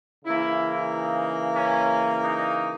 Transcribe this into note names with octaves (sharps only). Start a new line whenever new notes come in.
C#3 E3 A#3 E4
D#4
C#4
D#4